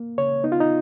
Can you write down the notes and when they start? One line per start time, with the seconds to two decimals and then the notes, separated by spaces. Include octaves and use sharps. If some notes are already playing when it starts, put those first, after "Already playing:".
Already playing: A#3
0.18 C#3 C#5
0.44 B3 D#4
0.52 F4
0.60 D#4